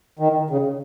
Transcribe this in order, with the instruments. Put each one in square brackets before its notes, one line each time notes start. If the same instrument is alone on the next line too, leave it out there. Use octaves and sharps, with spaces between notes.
[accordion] D#3
C#3